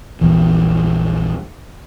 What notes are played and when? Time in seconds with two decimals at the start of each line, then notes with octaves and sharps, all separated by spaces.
0.21 A#1 E2 E3